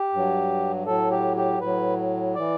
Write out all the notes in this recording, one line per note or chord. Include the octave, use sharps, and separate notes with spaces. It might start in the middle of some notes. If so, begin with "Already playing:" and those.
Already playing: G4
G2 F#3
A2 F#3 A4
G4
G4
A2 F#3 B4
E3 D5